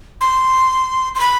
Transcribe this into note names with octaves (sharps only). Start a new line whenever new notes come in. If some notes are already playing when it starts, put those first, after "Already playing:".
C6
C6
B5